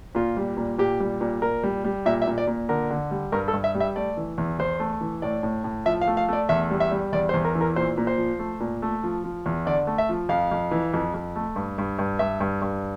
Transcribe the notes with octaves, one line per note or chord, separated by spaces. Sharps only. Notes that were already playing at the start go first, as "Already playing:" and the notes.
A#2 F4
G3
A#2
A#2 G4
G3
A#2
A#2 A#4
G3
G3
A#2 E5
E5
A#2
D5
A#2
D3 A#4
D3
G3
G2 A#4
A4
G2
E5
G3
E5
A3 D5
E3
E2
E2 C5
A3
E3
A2 D5
A2
A2
F3 E5
F5
A3
F5
A3 D5
E2 E5
G3
E5
G3
E2 D5
C5
E2
A#4
E3
A#4
A#2 C5
A#2
C5
F3
A3
A#2
A3
F3
F3
E2
D3 D5
A3
E5
F3
F2 F5
F2
E3
F2
F2
A3
G2
G2
G2
G2 E5
G2
G2